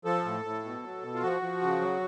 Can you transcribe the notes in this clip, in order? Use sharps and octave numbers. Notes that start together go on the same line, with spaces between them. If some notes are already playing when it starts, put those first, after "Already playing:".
F3 A4
A2
A2
B2
F#3
B2
F4
F3 F#4
F3
C#3
F#3